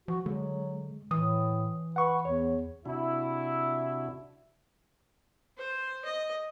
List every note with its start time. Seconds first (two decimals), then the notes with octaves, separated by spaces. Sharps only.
0.08 F3 F#4
0.26 D3 F#3 G#3
1.11 A2 E3 D#6
1.96 B4 F#5 C#6
2.25 E2 C#5
2.86 C3 D4 E4 F#4
5.58 C5
6.05 D#5